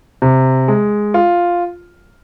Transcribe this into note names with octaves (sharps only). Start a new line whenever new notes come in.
C3
G#3
F4